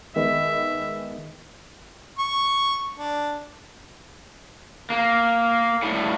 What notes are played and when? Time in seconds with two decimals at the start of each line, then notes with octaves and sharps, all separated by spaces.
0.16 D#3 G#3 B3 E5
2.19 C#6
2.98 D4
4.90 A#3
5.83 A2 G3